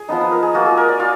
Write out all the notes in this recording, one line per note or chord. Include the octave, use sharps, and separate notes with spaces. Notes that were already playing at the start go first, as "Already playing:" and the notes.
Already playing: G#4
F3 B3 D#4 D#5
B4
A#4
G#4
A#3 F4 F#4
G#4
A#4
D5
F4 F5